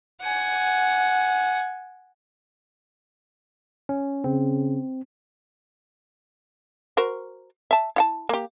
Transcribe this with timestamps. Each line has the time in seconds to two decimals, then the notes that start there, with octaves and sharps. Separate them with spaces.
0.22 F#5 G#5
3.89 C#4
4.24 C#3 C4
6.97 F#4 A#4 C5
7.71 E5 A5
7.96 E4 F#5 A5
8.29 A#3 G4